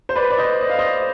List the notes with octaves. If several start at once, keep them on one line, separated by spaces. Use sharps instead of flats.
C5
B4 D5
D5
C5 D#5
D#5
F5
C5 D#5